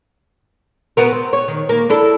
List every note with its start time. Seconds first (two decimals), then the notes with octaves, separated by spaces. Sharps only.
0.97 B3 F#4 A#4
1.12 C4
1.33 C#5
1.48 D#3
1.69 A#3
1.90 D4 E4 A4